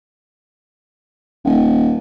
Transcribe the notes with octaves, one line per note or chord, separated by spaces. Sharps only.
D#1